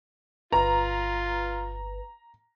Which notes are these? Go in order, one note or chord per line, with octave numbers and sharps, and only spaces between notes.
G1 F4 B4 A#5